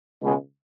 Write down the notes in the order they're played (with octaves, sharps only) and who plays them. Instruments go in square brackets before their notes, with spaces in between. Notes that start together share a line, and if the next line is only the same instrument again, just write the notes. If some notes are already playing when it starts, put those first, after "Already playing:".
[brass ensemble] C#2 B2 G#3